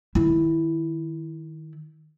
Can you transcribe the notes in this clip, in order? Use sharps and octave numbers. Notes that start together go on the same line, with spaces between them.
D#3 E4